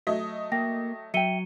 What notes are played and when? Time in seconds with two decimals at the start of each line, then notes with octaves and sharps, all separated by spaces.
0.07 F#3 A3 D#5
0.52 A#3 G5 A#6
1.14 F#3 E5 G5 C#7 D#7 G7